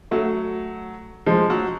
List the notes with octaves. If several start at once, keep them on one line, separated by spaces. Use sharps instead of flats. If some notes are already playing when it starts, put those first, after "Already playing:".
F#3 A3
F3 G#3
F#3